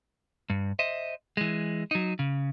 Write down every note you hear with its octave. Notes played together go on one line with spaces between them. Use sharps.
G2
C5 D#5 E5
E3 G#3
F#3 D#4
C#3